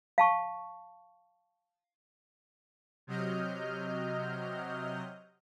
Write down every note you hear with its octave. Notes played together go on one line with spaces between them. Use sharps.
F5 A5 C#6
C3 F#3 D#5 F6 G6